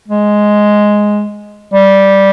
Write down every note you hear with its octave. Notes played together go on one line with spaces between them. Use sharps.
G#3
G3